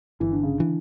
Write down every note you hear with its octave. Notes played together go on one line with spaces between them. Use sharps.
G1 E3
D3
C#3
D3
E3